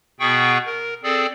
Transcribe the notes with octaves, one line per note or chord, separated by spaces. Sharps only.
B2 B3 G#4 F#5 G5 C#6
A#4
C4 G#4 A4 D5